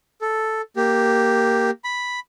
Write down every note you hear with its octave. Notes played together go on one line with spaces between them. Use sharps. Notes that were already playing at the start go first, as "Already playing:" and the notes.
A4
A#3 G4
B5